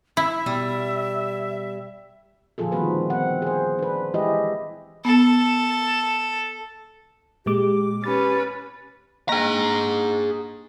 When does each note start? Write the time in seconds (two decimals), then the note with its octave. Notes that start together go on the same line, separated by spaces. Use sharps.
0.17 E4 E5 B5
0.46 B2 G3
2.58 A#2 D3 F3 F4 G#4 A4
2.72 D#3 G3 A3 C4 F#4 B4
3.10 B3 C4 F#5
3.42 G#4 C5
3.79 D4 B4
4.14 E3 G#3 E4 G4 G#4 D#5
5.05 B3 A4
7.46 A#2 G#3 G4 D6
8.04 C#4 G4 B4 A6
9.29 A#3 D4 G#4 A#5